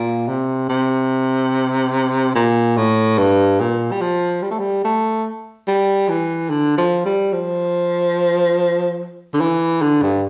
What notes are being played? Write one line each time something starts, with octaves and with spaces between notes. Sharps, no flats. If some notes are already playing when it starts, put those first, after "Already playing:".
Already playing: A#2
C3
C3
A#2
A2
G2
A#2
G3
F3
G3
A3
G3
A3
G3
E3
D3
F3
G3
F3
D3
E3
D3
G2